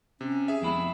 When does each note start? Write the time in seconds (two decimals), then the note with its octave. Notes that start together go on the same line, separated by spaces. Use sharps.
0.21 C3 C#4
0.48 G#4 E5
0.62 F2 G#3 B3 E4